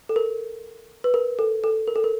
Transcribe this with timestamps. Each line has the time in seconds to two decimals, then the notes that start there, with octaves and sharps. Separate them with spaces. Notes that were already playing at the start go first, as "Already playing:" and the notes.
0.09 A4
0.16 A#4
1.04 B4
1.14 A#4
1.39 A4
1.64 A4
1.88 A#4
1.96 A4
2.04 A#4